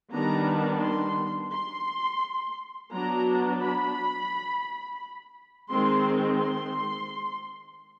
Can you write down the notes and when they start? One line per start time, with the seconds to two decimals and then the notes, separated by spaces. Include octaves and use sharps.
0.12 D#3 G3 B3 D4 A#5
0.82 C6
1.52 C6
2.92 F#3 B3 D4 A#5
3.61 B5
5.70 D#3 G#3 C4 C6
6.40 C6